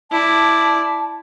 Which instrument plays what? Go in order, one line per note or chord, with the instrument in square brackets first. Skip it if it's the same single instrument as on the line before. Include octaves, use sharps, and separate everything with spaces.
[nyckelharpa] E4 D5 [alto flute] A5